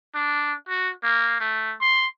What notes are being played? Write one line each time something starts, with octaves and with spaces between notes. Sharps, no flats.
D4
F#4
A#3
A3
C6